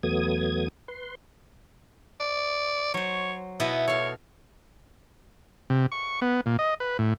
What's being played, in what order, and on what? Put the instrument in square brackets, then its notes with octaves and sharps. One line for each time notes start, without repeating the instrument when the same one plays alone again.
[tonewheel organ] E2 F#3 A3 B3 D#6 G#6
B4 C6
[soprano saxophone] D5
[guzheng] F#3 C5 [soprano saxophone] C#5
[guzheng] B2 E4 D#5 [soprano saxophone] B3
[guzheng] A4 F5 [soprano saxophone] C#5
[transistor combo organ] C3
C#6
B3
A#2
D#5
B4
A2